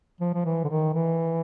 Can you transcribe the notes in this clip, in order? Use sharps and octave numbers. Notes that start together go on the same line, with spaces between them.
F3
F3
E3
D3
D#3
E3